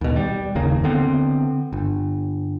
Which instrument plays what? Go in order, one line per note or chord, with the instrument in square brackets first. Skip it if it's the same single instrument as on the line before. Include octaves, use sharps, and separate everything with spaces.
[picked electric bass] D#2 B2
G3
F#1 D#2 C#3 A#3
D3 B3 C4
G1